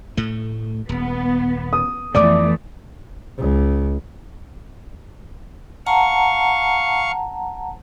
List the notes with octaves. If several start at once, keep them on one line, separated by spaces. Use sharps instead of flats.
A2 A3
D#1 B3
D#6
F2 E3 F3 A3 B3 D5 D6
C#2
F5 F#5 A5 A#5 C#6